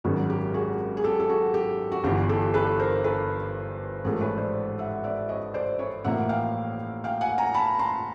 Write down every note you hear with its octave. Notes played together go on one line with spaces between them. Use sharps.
G#1 F#2 D#3 F#3 B3 F#4 G#4
G4
F#4 G#4
G#4
G4 A4
A4
F#4 G#4
G4
F#4
G1 G2 E3 G4
G4 A4
A4 B4
A#4 C5
A4 B4
A1 G#2 F3 A3 G#4 A#4
B4 C#5
C5 D5
E5 F#5
D5 E5
C#5 D#5
C5 D5
B4 C#5
A1 A2 F3 A#3 E5 F#5
F5 G5
F5 G5
F#5 G#5
G#5 A#5
A5 B5
A#5 C6